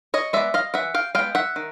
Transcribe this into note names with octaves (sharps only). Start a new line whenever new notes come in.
C#5 D#5
G#3 B3 D5 E5
D#5 F5
E3 E5 F#5
F5 G5
G#3 B3 F5 G5
E5 F#5
D#3